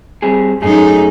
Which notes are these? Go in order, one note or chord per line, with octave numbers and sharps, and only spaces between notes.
G3 C4 G#4
F#2 A3 D#4 G#4